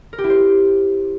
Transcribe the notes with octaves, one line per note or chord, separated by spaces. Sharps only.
A#4
G4
E4
C5